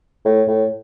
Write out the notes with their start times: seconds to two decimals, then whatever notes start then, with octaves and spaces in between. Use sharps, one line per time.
0.25 A2
0.47 A2